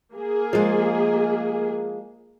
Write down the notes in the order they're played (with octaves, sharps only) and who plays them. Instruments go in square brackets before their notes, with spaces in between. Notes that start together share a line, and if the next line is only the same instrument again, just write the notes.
[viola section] A#3 G#4
[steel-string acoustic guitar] F3 G#3